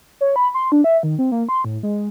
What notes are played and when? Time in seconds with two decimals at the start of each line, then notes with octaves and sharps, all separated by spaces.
0.21 C#5
0.36 B5
0.54 C6
0.72 D4
0.84 E5
1.03 D#3
1.19 C4
1.32 A#3
1.49 C6
1.64 A2
1.83 G#3